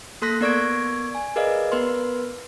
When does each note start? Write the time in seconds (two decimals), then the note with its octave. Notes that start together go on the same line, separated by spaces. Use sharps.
0.22 A#3 A4 C6 F#6 A#6 B6
0.41 B3 A#4 D5 C#6 G#6 D7
1.15 G#5
1.36 G#4 A#4 B4 D5 D#5 F5
1.72 B3 A#4 B4 C6